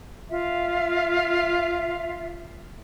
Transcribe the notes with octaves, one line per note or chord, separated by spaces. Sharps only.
F4 E5